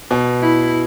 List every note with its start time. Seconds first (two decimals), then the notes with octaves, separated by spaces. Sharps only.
0.11 B2
0.41 E4